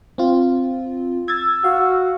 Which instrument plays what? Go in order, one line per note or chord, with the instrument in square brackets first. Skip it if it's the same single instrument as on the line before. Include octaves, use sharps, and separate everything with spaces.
[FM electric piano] C4 F4
[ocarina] E6 [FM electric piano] G#6 A6
[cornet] F#4 [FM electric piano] F5